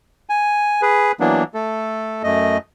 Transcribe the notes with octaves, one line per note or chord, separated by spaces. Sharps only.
G#5
G#4 B4
E3 F#3 A#3 B3 D4
A3 A4
F#2 A3 D#5